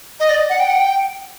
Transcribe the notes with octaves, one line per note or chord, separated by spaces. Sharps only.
D#5
D5
F#5
G5
F#5
G5